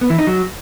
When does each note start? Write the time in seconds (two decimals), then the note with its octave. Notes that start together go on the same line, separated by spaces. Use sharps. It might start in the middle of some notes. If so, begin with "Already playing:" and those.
0.01 B3
0.10 E3
0.19 D#4
0.27 F#3